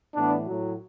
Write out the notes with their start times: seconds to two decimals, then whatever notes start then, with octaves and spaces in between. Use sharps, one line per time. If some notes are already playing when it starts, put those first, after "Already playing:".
0.15 A2 E3 B3 D4
0.46 A2 F#3